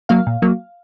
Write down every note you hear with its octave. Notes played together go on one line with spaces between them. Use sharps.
F#3 A#3 F5
A#2
F#3 A#3